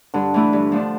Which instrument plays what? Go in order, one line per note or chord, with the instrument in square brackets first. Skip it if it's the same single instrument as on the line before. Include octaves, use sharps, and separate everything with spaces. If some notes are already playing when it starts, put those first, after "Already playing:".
[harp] G2 [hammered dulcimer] D3
[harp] E3 A3 E4
G2
F3 A3 D4